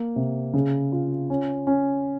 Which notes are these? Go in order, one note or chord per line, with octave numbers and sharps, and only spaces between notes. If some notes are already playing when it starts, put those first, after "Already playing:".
Already playing: A#3
C3
C#3
F4
C#4
C#4